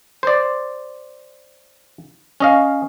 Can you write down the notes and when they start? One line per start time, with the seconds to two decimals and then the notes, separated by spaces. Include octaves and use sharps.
0.23 C5 D5
2.40 C#4 D#5 F5